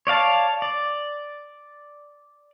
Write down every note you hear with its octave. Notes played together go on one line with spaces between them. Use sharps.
C#5 D5 F5 A5
D5